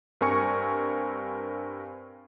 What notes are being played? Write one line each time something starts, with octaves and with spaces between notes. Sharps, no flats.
G2 C4 A#4 G#5 C#6 C#7